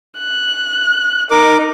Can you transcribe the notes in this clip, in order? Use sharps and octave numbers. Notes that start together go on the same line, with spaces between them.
F#6
D#4 A#4 D6